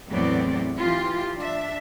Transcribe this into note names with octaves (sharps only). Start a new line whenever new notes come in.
E2 A2 F#3 B3 C4 D5
E3 F4 G4
D4 E5